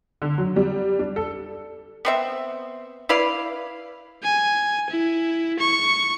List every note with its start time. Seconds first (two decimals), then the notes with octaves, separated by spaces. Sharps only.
0.22 D3
0.38 F#3
0.56 G3
0.99 D4
1.16 A4
2.05 B3 C4 E5
3.09 E4 B4 D5 F5
4.23 G#5
4.90 E4
5.59 C#6